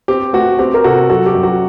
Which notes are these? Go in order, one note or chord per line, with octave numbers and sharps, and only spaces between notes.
C4 G4
A3 F#4
C4 G4
A#4
C3 F#4 A4
F#2 F#4 A4
G4
F#2
F#4